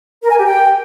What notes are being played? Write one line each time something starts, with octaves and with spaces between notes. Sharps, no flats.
A#4
G#5
G4
G5